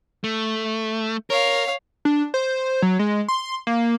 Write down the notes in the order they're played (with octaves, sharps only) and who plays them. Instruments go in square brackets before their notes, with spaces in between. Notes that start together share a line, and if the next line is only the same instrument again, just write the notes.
[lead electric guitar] A3
[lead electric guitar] A#4 [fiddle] C#5 F5
[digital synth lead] D4
C5
F#3
G#3
C6
A#3